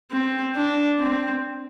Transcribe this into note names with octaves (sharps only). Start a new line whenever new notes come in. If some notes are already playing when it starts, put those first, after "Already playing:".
C4
D4
C4